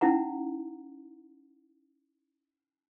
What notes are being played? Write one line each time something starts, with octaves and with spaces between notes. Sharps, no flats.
C#4 D#4 E4 F#5 A#5